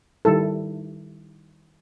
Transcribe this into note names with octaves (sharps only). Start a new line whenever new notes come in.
D#3 G3 E4 A4